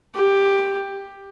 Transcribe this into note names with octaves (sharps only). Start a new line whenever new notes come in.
G4